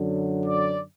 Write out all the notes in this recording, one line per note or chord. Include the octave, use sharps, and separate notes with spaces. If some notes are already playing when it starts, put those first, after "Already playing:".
Already playing: F#2 D3 F#3
D5